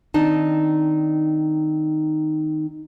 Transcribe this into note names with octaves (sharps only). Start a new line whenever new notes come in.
D#3 C4 D4 D#4 A5